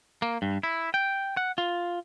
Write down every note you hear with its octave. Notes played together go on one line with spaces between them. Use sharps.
A#3
G2
E4
G5
F#5
F4